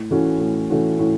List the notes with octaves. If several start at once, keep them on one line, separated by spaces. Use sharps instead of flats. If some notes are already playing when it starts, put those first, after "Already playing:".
Already playing: A2
E3 A3 C#4 F#4
A2
E3 A3 C#4 F#4
A2